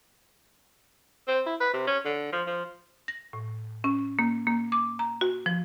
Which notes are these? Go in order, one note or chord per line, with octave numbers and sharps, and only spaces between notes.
C4
E4
B4
C3
C#4
D3
F3
F3
A#6
A2
C#4
A#3
A#3
D6
A#5
F#4
F3